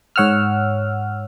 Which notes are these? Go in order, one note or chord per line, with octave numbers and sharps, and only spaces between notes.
G#2 C#5 F#5 E6 F6